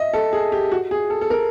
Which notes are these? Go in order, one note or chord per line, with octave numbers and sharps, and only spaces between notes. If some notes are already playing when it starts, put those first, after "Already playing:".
Already playing: D#5 E5
A4
G#4
G4
F#4
G#4
A4
A4
A#4